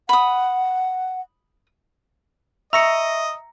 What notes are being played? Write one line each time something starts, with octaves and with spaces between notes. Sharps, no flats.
F#5 B5 D#6
D#5 E5 A#5 C#6 E6 A#6 C#7